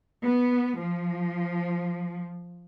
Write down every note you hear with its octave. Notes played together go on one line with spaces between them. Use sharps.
B3
F3